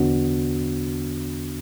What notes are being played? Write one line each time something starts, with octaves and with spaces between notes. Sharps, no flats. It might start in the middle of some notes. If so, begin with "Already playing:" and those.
Already playing: E2 D3 B3 D4 F#4